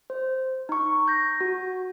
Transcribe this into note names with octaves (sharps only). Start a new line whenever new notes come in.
C5
D#4 C#6
G6 A#6
F#4